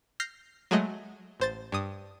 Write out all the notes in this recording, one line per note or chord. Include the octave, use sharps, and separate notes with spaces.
F6 G6 A#6 C7
F#3 G#3 A3 D#5
A1 C5 A6
G2 D#6